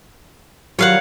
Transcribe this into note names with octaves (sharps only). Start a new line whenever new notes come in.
D#3 F#3 G3 F4 C#5 F5 F#5